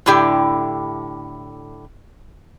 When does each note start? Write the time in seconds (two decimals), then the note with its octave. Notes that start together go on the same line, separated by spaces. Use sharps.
0.06 A2 D3 E4 G4 G5